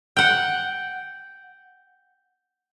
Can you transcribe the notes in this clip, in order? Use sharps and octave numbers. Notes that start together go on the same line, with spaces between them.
F#5 G5